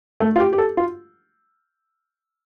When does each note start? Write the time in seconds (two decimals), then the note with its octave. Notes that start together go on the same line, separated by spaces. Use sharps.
0.20 A3
0.36 F4
0.40 G4
0.53 G4
0.58 A4
0.77 F4